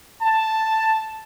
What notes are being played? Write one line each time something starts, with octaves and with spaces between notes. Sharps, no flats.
A5